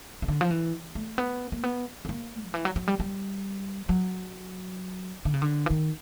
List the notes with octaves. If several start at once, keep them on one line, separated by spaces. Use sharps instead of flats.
C#3
D3
F3
E3
A3
B3
A#3
B3
B3
A#3
D#3
E3
F#3
F#3
G3
G3
F#3
D3
C#3
D3
E3
D#3